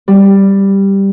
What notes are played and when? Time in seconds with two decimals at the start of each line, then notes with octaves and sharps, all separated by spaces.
0.08 G3